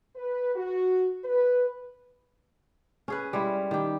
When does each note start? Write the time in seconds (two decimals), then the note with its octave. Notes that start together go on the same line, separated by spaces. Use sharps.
0.16 B4
0.56 F#4
1.24 B4
3.08 C#4 G#4 B4
3.33 G3 G#3 E4
3.71 D#3 G4